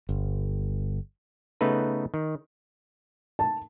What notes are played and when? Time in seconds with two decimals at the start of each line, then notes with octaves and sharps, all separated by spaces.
0.09 G1
1.61 C#3 A3 B3 D#4 B4
2.14 D#3
3.39 A5